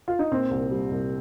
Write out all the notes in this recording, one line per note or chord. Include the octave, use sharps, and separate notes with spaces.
F4
D#4
A#2 C4
C2
G3
C2